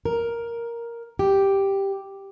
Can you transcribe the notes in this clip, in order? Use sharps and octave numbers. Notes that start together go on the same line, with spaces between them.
A#4
G4